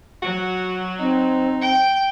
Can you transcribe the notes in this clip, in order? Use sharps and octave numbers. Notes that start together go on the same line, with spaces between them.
F#3 F#4
C4 D#4
G5